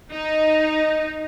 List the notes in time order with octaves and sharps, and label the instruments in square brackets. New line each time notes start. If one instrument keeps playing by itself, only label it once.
[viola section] D#4